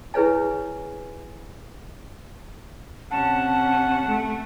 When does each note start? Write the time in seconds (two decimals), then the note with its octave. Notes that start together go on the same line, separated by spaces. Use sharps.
0.14 E4 G#4 B4 C#5 G#5
3.11 C3 C#4 F#5 A5
4.07 A3